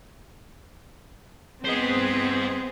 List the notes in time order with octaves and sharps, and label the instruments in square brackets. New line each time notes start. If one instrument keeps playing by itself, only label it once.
[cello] B3 G#4 [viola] C4 [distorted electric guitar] C5 D#5